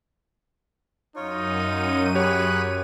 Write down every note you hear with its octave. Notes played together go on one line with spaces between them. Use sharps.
F#2 D#4 F4 C#5 D#7
G4 G#4 C#5 B5 C#6 F#6